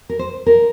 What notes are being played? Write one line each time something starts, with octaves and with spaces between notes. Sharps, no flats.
A#4
C5
A#4